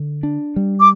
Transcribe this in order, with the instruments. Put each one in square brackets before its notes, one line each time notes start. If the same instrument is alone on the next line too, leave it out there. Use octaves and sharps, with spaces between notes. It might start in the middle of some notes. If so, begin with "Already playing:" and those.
Already playing: [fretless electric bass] D3
D4
G3
[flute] D6